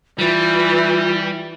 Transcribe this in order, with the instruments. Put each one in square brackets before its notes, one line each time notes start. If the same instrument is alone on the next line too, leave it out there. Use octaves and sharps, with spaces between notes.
[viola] E3 [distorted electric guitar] G3 [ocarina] F4